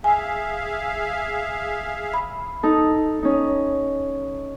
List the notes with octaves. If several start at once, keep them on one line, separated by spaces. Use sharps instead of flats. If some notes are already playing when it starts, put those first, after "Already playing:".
G#4 E5 F5 G#5
B5
D#4 A4
C#4 D#4